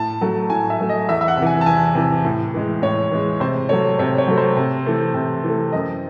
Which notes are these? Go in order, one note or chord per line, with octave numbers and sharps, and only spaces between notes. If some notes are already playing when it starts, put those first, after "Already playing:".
Already playing: A2 A5
F#3 A3
A2 G#5
E5
F#3 A3
D#5
E2 E5
E5
F#5
C3
E3 G#5
A5
E2 G#5
C3 E3
A2
E3 G#3
A2 C#5
E3 G#3
C3 C5
F#3 A3 C#5
C3 C#5
C#5
F#3 A3
C5
C3
E3 A3
C3
E3 A3
F#2 D#5